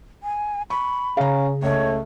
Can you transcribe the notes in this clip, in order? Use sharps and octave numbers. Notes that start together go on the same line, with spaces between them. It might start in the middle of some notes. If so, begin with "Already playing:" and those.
G#5
B5 C#6
C#3 C#4 G#4 F5 A#5
C#2 A3 C#5